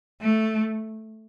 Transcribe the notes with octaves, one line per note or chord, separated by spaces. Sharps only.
A3